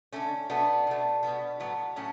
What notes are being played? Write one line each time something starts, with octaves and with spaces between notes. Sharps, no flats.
D3 A3 C#4
B2 F#3 A3 B3 D4
B2 A3
B2 G3 B3
A2 F#3 B3
A2 F#3 A3 C#4